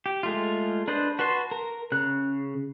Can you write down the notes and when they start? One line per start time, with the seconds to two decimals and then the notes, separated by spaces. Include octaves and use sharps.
0.06 G4
0.23 G#3 A3 F4
0.88 D4 B4 C5 D#5
1.19 F#4 B4 A5 C6
1.51 A#4
1.92 C#3 F#6